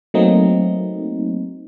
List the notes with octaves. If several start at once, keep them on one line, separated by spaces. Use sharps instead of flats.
F#3 A3 A#3 C4 D#4